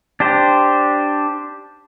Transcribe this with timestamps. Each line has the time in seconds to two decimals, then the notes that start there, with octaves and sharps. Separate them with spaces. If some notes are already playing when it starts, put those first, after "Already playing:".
0.20 D4 G4 C5